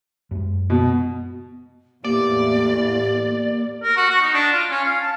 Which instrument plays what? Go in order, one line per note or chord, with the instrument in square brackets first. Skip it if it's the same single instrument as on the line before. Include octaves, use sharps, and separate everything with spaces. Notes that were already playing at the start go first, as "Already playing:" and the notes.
[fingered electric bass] F#2 G#3
[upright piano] B2
[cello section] E2 A2 [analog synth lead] A#3 [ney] G4 [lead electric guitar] D5
[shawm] A#4
F#4
F#4
D#4
D4
F4
C#4
F5
A5